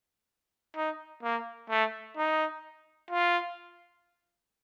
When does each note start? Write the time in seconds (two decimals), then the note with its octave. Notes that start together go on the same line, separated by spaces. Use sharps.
0.76 D#4
1.23 A#3
1.70 A3
2.17 D#4
3.11 F4